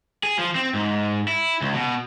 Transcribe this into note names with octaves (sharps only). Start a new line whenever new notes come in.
G#4
F3
C4
G#2
E4
C#2
B2